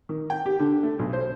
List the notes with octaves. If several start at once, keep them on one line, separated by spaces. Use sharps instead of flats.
D#3
G5
G4
D3
A3
B1
C5